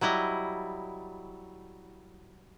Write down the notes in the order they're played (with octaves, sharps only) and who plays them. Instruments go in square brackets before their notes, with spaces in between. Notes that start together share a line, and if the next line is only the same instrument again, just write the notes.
[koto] F#3 G3 E4 D#5